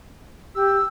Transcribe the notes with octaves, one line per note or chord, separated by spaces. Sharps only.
G4 E6